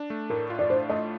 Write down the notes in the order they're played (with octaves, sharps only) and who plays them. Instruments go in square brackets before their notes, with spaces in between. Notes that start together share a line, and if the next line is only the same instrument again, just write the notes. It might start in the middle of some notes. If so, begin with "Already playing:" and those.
Already playing: [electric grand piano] D4
A3
[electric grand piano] A2 [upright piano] A#4
[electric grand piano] F4
[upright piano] D5
[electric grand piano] D4 [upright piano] C5
[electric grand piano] A3 [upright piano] D#5